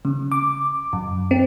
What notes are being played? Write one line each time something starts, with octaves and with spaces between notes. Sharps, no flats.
C#3
D6
F#2
C4